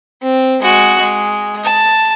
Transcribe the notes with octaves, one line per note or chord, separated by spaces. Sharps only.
C4
G#3 F#4
G#3
A5